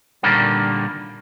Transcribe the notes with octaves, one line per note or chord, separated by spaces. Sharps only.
A#2 D3 D#3 G3 A#3